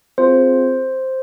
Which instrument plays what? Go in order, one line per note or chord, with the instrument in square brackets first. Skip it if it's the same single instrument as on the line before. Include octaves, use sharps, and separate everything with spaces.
[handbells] C4 F4 G#4 C5